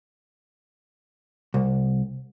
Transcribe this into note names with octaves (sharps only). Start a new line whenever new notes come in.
C2